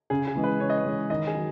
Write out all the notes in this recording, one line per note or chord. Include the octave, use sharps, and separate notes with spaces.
C#3 G#4
G#4
E3 G#3
B4
C#3 C#5
D#5
C#5
E3 G#3
D#3 D#5
G#4
F#3